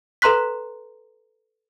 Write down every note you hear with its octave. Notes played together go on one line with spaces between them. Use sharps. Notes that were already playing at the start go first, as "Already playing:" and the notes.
A4 B4 A#5 C6 F#6 B6